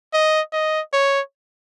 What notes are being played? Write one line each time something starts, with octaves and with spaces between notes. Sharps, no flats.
D#5
D#5
C#5